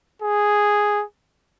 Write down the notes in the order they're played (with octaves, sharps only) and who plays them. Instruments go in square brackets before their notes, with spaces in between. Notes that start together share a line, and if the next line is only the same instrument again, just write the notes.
[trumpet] G#4